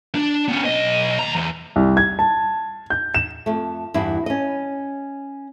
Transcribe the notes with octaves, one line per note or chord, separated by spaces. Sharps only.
D4
B3 C#4
B1 D#5
D#2 A#5
E2
C2
G#6
A5
G6
E7
F2 A3
E2 G2 E4 G4
C#4 D#5